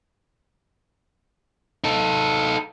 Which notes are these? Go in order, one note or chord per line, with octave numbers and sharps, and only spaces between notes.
D#4 A4